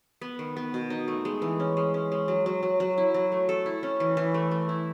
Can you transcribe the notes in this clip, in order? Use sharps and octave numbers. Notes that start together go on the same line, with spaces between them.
B3
D#3
B3
B2
D#4
A3
G#3
E3
C#4
G#3
C#4
G#3
F#3
F#3
F#3
F#3
E4
F#3
A3
A4
E4
C#4
E3
E3
A3
A3
E4